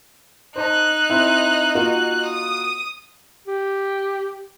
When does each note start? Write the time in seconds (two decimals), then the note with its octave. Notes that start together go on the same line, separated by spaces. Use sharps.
0.56 D#4 C5 D#5 A5 F#6
1.10 C4 E4
1.75 A#3 F4 F#4
2.25 D#6
3.47 G4